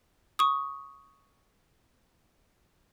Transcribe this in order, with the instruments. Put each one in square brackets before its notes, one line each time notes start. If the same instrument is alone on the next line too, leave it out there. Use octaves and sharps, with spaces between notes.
[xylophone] C#6 D#6